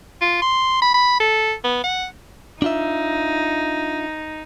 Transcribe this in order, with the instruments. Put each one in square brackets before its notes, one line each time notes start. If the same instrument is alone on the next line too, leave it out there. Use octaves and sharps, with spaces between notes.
[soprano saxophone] F4
C6
B5
B5
A4
B3
F#5
[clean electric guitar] D4 F4 E5 [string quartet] D#4